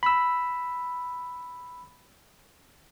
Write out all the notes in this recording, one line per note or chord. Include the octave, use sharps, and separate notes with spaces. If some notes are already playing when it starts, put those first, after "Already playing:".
B5 E6